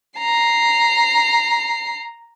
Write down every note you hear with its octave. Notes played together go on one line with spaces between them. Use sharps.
A#5 C7